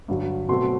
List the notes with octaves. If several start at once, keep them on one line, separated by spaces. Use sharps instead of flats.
G2 D3 F#3
B2 F#3 A3 C4 C6